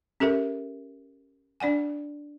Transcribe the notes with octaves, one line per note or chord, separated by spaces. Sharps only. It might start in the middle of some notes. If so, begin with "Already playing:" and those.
C#4 G4 A4 A#4 E5
D4 D5 F#5 G#5